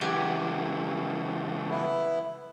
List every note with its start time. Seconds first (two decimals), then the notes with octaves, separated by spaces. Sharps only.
0.01 C#2 E3 G4 F#5 G#5
1.69 B3 E4